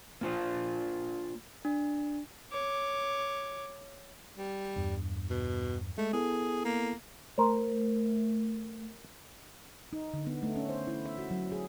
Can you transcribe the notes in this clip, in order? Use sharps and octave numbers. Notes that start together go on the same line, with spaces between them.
A#3 D4 F4 C5
D4
C#5 D6
G3
E2 G2
B2
G#3 A3
B3 E4 G#4 A4
A#3
A3 A#4 C5
D#4
D3
B3
A3
C#4
C5
E4
E5
F#4
F#3
G#4